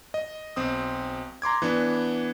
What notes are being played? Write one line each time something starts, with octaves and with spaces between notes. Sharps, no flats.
D#5
B1 C4 D#6
A#5 C6 D6 G#6
E3 B3 D4